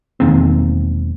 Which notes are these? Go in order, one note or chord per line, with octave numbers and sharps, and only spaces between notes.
E1 D#3 A#3 C4